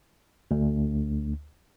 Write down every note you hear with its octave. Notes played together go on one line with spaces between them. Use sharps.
D2